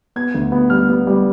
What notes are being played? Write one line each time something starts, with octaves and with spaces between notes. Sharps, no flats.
B3 G#6
D2
B3
G3 F6
B3
G3